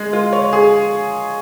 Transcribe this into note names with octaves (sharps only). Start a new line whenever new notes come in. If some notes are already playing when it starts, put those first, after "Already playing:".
Already playing: G#3
F4
C#5
G#4